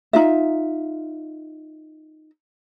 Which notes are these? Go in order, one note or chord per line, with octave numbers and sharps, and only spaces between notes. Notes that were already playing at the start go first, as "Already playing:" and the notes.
D#4 F4 E5